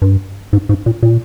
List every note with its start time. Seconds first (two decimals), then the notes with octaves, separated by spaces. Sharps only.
0.02 G2
0.53 G#2
0.69 G#2
0.86 A#2
1.03 A#2